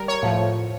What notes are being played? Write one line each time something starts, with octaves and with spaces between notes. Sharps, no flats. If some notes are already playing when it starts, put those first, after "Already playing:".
Already playing: G3 A#4
C#5
A2 F3